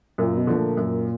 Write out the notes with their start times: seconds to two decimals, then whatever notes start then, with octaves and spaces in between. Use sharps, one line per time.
0.18 F#2 A#2
0.38 B2
0.47 D3 F3 A3
0.57 A#2
0.77 F#2